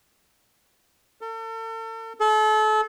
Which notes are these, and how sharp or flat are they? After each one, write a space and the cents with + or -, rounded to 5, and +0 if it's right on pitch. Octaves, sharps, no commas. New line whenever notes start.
A4 +40
A4 -35